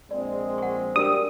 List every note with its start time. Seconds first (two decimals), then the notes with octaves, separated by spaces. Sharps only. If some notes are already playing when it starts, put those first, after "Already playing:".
0.11 A#1 G#3 C4 D5
0.58 F#5 C#6
0.96 G3 D4 F#4 A#4 D#6